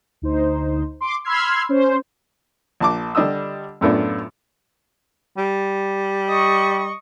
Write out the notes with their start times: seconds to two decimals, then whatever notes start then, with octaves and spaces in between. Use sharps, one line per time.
0.22 D2 D#4 C5
1.01 C6 D6
1.24 B5 C6 E6 F6 G#6 C7
1.69 C#4 C5
2.80 A#1 A5 D6
3.15 D3 G3 D4 D#5 D#6 E6
3.81 F#2 A2 B3 D4 F4
5.37 G3
6.29 D#5 C#6